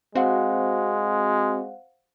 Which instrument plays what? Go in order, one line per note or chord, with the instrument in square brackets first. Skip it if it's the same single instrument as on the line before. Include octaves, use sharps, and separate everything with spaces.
[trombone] G#3 [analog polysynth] C4 F#4 [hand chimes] C5 F5 F#5